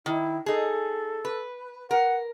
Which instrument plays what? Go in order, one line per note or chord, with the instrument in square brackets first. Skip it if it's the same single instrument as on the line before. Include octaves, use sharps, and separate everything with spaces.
[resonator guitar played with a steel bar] D#3 [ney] E4
[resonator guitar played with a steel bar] D#4 G#4 [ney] A4
[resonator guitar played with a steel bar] B4
[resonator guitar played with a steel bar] A#4 [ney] F#5